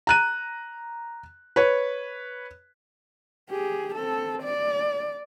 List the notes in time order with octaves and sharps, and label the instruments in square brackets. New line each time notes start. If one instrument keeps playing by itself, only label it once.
[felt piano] A#5 F#6 D#7
B4 C#5
[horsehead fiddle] G4 G#4
C4 A4
D5